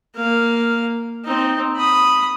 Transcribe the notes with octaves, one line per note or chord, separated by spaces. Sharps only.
A#3 F5
C4 D#4
B5 D#6